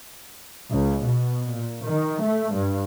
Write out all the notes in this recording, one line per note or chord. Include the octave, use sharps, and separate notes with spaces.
C#2
B2
A#2
D#3
A3
G2